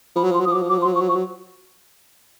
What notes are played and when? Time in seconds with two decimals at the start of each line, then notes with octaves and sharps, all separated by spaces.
0.16 F3 B5
0.24 F#3
0.31 F3
0.34 C6
0.40 F#3
0.45 F3 D#6
0.52 D6
0.55 F#3
0.62 F3
0.69 F#3 D6
0.78 F3
0.82 C6
0.85 F#3
0.93 F3 C#6
1.01 F#3
1.09 F3 C#6
1.16 F#3